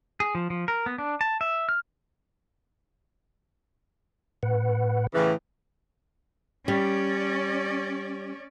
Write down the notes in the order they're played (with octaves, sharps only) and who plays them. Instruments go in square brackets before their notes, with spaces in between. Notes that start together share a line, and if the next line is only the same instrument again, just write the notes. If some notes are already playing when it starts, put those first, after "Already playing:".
[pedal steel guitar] G#4
F3
F3
A#4
B3
D4
A5
E5
F6
[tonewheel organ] A2 B4 F#5
[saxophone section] A2 C#3 E3
[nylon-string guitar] G3 [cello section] C#4 D5